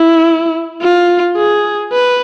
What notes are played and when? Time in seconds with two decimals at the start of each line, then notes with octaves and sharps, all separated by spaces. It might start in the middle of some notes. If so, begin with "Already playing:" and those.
Already playing: E4
0.82 F4
1.37 G#4
1.92 B4